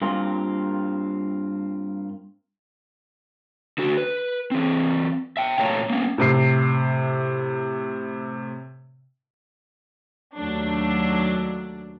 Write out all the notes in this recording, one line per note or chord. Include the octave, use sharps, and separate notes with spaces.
G2 A#3 C4 F4
D3 F#4
B4
E3 C4
E5 G5
A#2 A3 C#5 F5 A5 A#5
A#3 B3 C#4
A2 C3 C7
D#2 F#3 A3 D4